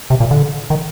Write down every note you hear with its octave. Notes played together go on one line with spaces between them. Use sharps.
C3
A#2
D3
D#3